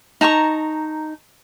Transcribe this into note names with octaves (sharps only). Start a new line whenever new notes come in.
D#4 A5 A#5 C#6